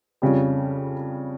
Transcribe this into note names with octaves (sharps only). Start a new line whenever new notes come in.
F2 C#3 G3